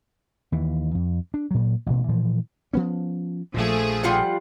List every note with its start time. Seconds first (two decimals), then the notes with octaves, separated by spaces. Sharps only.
0.52 D#2 E3
0.95 F2
1.34 D4
1.51 A#2 F#3
1.86 A1 B2
2.08 A#2 E3 F3
2.73 F3 B3 C#4
3.54 A#1 A#2 F3 A3 G#4
4.03 G3 F4 F#5